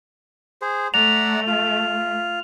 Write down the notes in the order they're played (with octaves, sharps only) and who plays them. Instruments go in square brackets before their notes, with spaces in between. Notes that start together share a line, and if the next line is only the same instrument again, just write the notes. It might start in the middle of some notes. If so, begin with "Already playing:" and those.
[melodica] G#4 C5
[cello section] A3 [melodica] D5 F#5 A#5 [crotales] F7
[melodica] F4